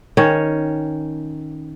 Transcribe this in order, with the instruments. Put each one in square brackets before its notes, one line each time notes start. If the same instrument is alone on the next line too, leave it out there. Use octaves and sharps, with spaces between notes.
[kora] D#3 C#4 C#5